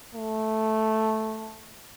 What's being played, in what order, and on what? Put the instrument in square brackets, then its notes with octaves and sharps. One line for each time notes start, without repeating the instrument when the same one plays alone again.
[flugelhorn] A3